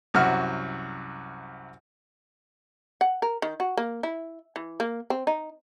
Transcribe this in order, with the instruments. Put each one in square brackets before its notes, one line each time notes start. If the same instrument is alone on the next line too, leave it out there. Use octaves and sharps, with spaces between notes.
[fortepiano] C2 F#2 F#4 F6
[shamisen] F#5
A#4
D#3
F#4
A#3
E4
E3
A#3
C4
D#4